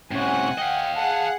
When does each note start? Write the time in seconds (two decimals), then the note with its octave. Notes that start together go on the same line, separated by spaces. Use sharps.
0.11 A2 C3 C#4 F#5 G#5
0.58 D#5 F5 G5
0.95 G#4 F#5 A5